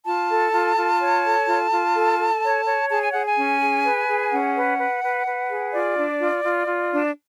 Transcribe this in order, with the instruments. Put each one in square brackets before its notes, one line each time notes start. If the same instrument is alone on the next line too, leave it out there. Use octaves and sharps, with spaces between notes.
[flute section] F4 A5
A4
F4
F4
C#5
A4
F4
F4
A4
A4
C#5
C#5
G#4 A5
G#5
G#4 F#5
G#5
C#4
G#4
B4
G#4
C#4 F#5
B4
B4
B4
B4
G#4
F4 D5
D4
F4
F4
F4
D4